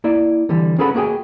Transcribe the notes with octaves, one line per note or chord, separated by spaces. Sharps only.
A#3 E4 D5
D3 E3 G3
C#4 G#4 A4 B4 F#5 B5
A#3 F#4 G#4 G5 G#5